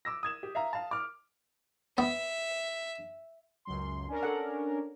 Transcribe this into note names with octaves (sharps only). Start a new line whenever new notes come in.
D6 E6 A#6
D#6 G#6 E7
G4
E5 F5 A#5
F5 A5
D6 F6
B3 E5
C#2 F#2 C6
C#4 D4 A#4
A4 F#5